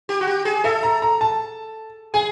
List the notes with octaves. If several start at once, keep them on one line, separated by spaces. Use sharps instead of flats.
G4
F#4
G4
G#4
A4 E5
A#5
A#5
A5
G#4 G#5